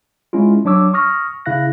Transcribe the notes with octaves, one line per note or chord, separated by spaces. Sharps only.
G#3 C#4 E4 F4
F#3 D4 C#5 D6 E6
C#6 D#6 F6 A#6
C#3 E4 F5 F#6 A#6